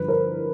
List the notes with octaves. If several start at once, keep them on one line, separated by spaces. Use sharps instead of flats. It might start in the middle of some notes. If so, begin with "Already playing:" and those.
Already playing: G2 D3 F3 B4
A#4 C5